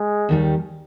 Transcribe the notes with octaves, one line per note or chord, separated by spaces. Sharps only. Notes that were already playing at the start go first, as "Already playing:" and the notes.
Already playing: G#3
D#2 D#3 G3